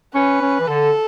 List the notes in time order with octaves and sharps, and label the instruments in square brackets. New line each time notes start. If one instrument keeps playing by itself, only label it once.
[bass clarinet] C#4 [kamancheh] B4
[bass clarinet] C#4
E3
[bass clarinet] D3 [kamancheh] A4